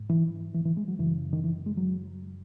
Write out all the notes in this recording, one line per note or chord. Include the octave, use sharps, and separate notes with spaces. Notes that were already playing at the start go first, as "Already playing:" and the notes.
Already playing: G#2
E3
E3
E3
G#3
F#3
F#2 C#3 E3
D#3
E3
G#3
F#3